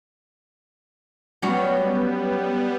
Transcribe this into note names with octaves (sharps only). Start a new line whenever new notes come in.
F#3 G3 B3 C#4 F#4